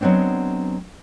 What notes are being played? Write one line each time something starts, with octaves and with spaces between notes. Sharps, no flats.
F#3 G#3 B3 C4 D4